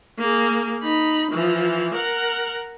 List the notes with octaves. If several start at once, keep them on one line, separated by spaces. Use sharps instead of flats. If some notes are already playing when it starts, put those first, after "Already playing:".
A#3 G#4
D#4 B5
E3 F3
A#4 F#5